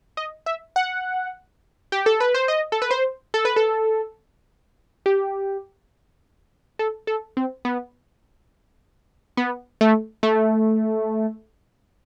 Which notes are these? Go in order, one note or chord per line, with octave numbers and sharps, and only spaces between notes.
D#5
E5
F#5
G4
A4
B4
C5
D#5
A4
B4
C5
A4
B4
A4
G4
A4
A4
C4
B3
B3
A3
A3